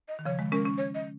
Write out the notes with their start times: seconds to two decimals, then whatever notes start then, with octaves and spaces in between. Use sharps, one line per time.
0.08 D#5
0.19 D#3
0.25 C#3 F3 C#5
0.39 D#3 G#3
0.52 G#3 C#4 A#4
0.65 G#3 C#4
0.78 C#5
0.95 D#5